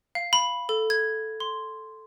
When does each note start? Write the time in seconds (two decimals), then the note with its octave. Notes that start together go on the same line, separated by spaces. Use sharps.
0.15 F5
0.33 B5
0.69 A4
0.90 G#6
1.40 C6